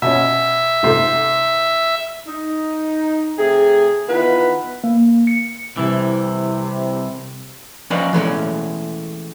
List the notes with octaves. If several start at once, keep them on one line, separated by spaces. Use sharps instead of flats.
B2 C#4 E5
G#2 C3 A3
D#4
C3 A3 G#4
D#3 E3 B3 F4 B4
A#3
C#7
C2 C3 E3
F3 C#4 B4 D5 D#5 F5
E3 G#3 A3 C#4